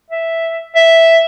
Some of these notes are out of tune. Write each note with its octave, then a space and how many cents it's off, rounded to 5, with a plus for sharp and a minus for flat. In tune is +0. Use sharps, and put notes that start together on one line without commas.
E5 +0
E5 +0